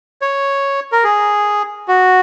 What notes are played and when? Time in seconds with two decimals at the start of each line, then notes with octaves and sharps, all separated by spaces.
0.22 C#5
0.92 A#4
1.04 G#4
1.88 F#4